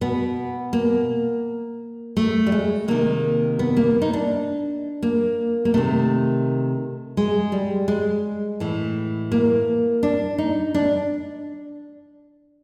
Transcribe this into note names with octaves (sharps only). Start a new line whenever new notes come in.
B2 B3
A#3
A3
G3
G#3
C3 D#3 A#3
B3
A#3
D#4
D4
A#3
A#3
C3 D#3 A3
G#3
G3
G#3
A2 E3
A#3
D4
D#4
D4